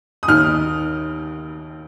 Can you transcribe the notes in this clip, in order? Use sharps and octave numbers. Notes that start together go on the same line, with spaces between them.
D#6
D#2 D#3 F6